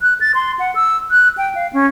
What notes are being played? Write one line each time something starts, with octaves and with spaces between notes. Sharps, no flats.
F#6
A6
C6
F#5
E6
F#6
G5
F5
C#4